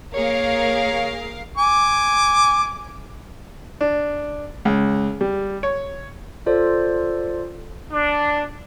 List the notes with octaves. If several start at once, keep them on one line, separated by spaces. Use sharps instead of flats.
A#3 G#4 A#4 C#5 F5
G#5 D6
D4
C#2
G3
C#5
F4 A4 C5 D5
D4